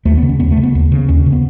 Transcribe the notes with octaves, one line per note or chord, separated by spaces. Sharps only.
D#2 A3
B3
C#3
C#4
D#2 B3
A3
C#3
B3
D#2
C#3
D#2 C#4
C#3
B3